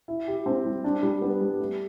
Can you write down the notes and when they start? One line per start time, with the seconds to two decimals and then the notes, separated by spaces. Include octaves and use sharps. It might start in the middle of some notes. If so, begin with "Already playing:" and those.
0.08 E4
0.28 G4
0.46 C4
0.65 G3
0.84 D4
1.03 G3
1.21 B3
1.41 G3
1.60 A3